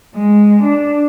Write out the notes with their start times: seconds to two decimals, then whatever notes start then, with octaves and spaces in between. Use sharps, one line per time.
0.16 G#3
0.63 D4